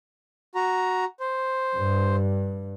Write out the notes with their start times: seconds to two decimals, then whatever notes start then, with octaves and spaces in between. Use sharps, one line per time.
0.55 F#4 A#5
1.20 C5
1.75 G2